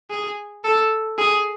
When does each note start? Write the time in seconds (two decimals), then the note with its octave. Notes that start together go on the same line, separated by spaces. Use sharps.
0.10 G#4
0.64 A4
1.18 G#4